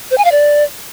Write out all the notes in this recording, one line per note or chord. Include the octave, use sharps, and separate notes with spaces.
C5
G#5
F5
D5